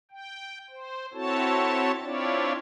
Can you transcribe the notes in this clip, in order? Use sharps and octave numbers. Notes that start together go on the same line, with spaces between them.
G5
C5
C4 E4 F#4 A4 C#5 A5
C4 D4 E4 F4 C#5 D5